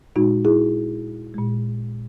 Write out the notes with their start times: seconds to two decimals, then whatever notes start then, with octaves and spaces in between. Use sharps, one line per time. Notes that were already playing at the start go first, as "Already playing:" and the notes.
0.16 A#2 G#3 D#4 F#4
0.45 E4 G#4
1.34 A#2 G#3